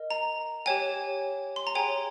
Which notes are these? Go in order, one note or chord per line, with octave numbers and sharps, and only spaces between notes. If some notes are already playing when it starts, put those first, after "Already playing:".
Already playing: A#4 D#5
A#5
G4 C#5 G5 G#5
C6
A#5
G#4 C#5 G5 G#5